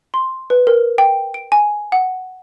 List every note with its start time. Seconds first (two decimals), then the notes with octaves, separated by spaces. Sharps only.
0.14 C6
0.50 B4
0.67 A#4
0.98 G5
1.34 D7
1.52 G#5
1.92 F#5